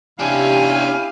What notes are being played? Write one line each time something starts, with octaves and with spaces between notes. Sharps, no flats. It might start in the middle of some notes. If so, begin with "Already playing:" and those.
C3 C#4 D4 E4 G4 F5 G#5